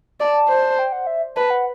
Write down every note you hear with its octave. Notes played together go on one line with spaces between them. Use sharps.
D5 A5
C5
G5
F#5
E5
B4 A5
F#5